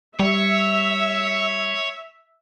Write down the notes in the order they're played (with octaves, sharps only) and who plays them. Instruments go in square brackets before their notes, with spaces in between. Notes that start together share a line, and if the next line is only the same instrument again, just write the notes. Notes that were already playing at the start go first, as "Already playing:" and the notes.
[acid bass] G3 [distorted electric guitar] C#5 [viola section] E5